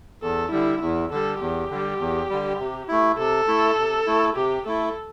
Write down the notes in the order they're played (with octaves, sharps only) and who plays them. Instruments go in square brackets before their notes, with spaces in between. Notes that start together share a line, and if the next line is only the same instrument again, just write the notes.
[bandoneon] E2 [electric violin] A4
[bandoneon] D3 G3 [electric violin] E4
[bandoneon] E2 [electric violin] E4
[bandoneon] D3 G3 [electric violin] A4
[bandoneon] E2 [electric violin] G4
[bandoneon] D3 G3
E2
D3 G3
C3
A3 E4
[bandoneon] C3 [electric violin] A4
[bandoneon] A3 E4
C3
A3 E4
[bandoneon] C3 [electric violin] G4
[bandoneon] A3 E4 [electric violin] A4